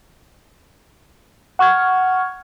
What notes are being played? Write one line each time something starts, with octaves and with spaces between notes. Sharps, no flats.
F#5 C#6 F6 G#6